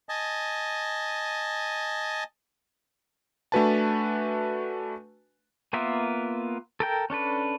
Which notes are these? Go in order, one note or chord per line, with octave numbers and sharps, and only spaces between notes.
D#5 G#5 A5
A3 D4 F#4 B4 G#5 A5
A#3 B3 F4 A#4 E5
A4 A#4 G5
C#4 D4 A4 B4